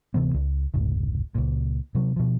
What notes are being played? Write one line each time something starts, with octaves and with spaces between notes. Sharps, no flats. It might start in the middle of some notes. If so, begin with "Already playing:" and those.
D1 C3 E3 B3
C#2
F1 C#2 G#2
C#2 A#2
C3 F#3
B2 F3